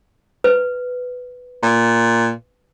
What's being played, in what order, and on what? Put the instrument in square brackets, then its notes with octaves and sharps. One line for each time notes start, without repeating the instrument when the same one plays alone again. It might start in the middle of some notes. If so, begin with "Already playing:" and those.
[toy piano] B4
[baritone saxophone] A#2